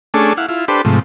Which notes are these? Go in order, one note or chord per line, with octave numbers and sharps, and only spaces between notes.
A3 C#4 D4 G#4 A4
E4 F5 F#5
E4 F4
D4 G4 A4 B4 C5
G#2 C3 F3 A3